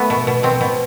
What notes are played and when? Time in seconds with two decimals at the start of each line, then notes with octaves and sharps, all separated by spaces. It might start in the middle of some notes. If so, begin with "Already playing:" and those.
Already playing: A3 B3
0.10 B2
0.27 B2
0.43 B2 C4
0.61 B2